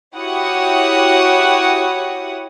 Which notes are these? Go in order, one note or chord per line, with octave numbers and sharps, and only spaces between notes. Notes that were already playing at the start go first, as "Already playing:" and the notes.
E4 F#4 G4 C#5 F#5 D#6